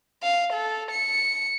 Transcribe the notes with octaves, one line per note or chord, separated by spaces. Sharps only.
F5
A4
C#7